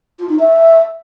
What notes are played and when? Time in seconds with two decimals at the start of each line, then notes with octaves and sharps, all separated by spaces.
0.19 F4
0.29 D#4
0.39 E5